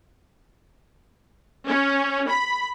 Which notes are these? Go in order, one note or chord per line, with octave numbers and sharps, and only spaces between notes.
C#4
B5